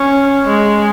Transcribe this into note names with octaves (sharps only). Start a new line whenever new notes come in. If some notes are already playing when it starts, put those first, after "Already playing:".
Already playing: C#4
G#3